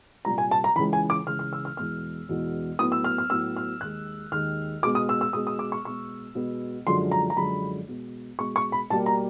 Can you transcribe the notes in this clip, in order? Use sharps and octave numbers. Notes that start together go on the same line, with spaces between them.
C2 A#2 G3 A#5
G#5
A5
A#5
C#2 C#3 E3 B5
G#5
D6
C#2 C#3 E3 F6
F6
E6
F6
E2 B2 G#3 B3 F6
E2 B2 G#3 B3
A2 F#3 B3 D#6
E6
F6
F6
A2 F#3 B3 E6
F6
D#2 D#3 G#3 F#6
D#2 D#3 G#3 F6
B2 G#3 B3 D6
D#6
E6
E6
B2 G#3 B3 D#6
D#6
D6
C#6
B2 G#3 B3 C#6
B2 G#3 B3
F#2 D3 F3 G#3 C6
A#5
A#5
F#2 D3 F3 G#3 B5
B2 G#3 B3
B2 G#3 B3 C#6
C#6
B5
B2 G3 A#3 A5
A#5